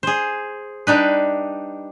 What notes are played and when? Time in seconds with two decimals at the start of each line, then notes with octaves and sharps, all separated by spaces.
0.03 G#4 C5
0.87 G3 D4 D#4 B4